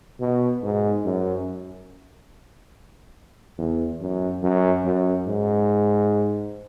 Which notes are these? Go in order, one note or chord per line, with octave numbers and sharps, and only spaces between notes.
B2
G#2
F#2
E2
F#2
F#2
F#2
G#2